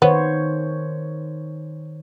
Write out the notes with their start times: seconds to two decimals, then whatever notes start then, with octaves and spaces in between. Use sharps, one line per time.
0.02 D#3 B3 C5 C#5